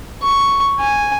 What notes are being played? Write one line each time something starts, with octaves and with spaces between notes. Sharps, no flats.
C#6
G#5